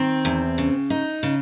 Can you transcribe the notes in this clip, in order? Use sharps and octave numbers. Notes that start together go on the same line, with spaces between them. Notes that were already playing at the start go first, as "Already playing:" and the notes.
Already playing: D#3 C4
E2
C#3
D#4
C#3